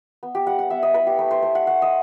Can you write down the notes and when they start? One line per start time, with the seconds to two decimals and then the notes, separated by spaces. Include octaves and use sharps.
0.23 B3
0.35 G4
0.46 G3 F#5
0.59 F#5
0.70 B3 E5
0.83 D#5
0.94 E4 B4
1.07 G4
1.19 A3 B4
1.31 C5
1.42 A3 C5
1.55 F#5
1.67 A3 F#5
1.82 D#5